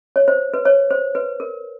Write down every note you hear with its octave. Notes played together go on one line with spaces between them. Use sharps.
C#5
C5
B4
C#5
C5
B4
A#4